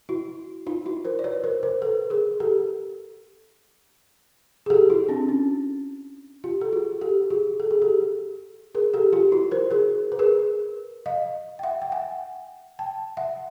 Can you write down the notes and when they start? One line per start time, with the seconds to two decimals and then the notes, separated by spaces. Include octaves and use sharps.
0.09 E4 F#4
0.67 D#4 F4
0.86 E4 F#4
1.05 A#4 C5
1.19 D5
1.24 B4 C#5
1.44 A#4 C5
1.63 A#4 C5
1.82 A4 B4
2.10 G#4 A#4
2.40 G4 A4
4.66 G#4
4.70 G4 A4
4.90 E4 F#4
5.09 C4 D4
5.28 C#4
6.44 F4 G4
6.61 A4
6.73 F#4 G#4
7.01 G4 A4
7.30 F#4 G#4
7.60 A4
7.71 G#4
7.82 G4 A4
8.75 G#4 A#4
8.94 G4 A4
9.13 F4 G4
9.32 E4 F#4
9.51 A#4 C5
9.71 G#4 A#4
10.12 B4
10.19 G#4 A#4
11.06 D#5 F5
11.59 G5
11.63 E5 F#5
11.82 G5
11.92 F#5 G#5
12.79 G5 A5
13.17 E5 F#5